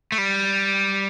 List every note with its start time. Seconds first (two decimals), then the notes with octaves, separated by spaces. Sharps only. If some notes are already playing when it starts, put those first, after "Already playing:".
0.12 A3
0.18 G3